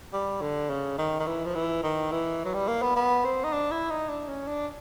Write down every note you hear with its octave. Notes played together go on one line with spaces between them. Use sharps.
G3
D3
C#3
D#3
D#3
E3
F3
E3
D#3
E3
F#3
G3
A#3
B3
B3
C4
D#4
D4
E4
D#4
D4
C#4
D4